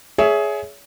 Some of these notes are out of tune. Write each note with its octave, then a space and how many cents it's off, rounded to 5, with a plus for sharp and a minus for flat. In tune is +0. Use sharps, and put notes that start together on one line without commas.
G#4 +15 C#5 +25 E5 +0